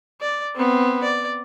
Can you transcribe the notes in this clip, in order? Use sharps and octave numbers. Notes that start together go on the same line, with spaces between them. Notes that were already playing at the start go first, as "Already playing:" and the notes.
D5
B3 C4
D5